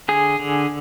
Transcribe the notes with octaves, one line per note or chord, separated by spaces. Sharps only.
D3 G#4
D3